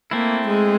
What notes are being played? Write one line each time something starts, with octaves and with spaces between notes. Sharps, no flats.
A3 A#3 C4 E4
G#3